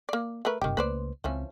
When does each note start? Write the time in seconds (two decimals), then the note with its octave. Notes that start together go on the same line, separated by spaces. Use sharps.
0.09 A#3 D5
0.45 A3 A#4 B4
0.62 F#1 G2 C3 D#3 G4
0.77 C#2 A3 A#3 B4 C5 D5
1.24 C#2 E3 F3 C4 C#4